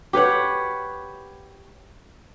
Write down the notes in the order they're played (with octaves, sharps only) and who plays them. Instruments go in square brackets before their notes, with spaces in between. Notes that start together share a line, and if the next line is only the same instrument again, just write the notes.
[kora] G4 B4 C#5 F#5